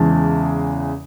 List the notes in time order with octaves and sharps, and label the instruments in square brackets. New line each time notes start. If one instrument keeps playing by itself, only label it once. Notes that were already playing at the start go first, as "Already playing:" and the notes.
Already playing: [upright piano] E2 C#3 E3 G#3 A5